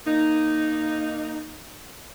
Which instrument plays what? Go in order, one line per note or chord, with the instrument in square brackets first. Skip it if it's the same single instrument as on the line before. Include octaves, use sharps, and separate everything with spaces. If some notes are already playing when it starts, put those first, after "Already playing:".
[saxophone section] A#3 D#4